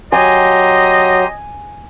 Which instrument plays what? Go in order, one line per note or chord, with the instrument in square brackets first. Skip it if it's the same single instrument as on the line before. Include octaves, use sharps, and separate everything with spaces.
[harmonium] F#3 [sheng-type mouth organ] G4 A#5 C6 [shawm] D#5 [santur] G#5